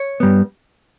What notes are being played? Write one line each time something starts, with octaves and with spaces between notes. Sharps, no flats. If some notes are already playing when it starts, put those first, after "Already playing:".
Already playing: C#5
G2 G3 B3